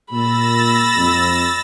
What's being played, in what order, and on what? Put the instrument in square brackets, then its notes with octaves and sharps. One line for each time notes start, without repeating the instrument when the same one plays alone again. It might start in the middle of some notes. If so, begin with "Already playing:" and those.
[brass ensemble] A#2 [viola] B5 [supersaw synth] E6 A6 A#6
[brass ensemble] F2